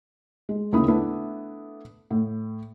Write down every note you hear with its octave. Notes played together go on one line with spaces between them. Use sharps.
G#3
D#2 C#3 E4 B5 D#6
A3 B3 D4 E4
A2